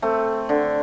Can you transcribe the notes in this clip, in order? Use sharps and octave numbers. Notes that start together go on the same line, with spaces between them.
A3 C4
D3